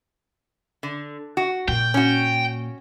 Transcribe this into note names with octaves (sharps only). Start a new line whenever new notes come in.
D3
F#4
A#2 G5
C#4 F#4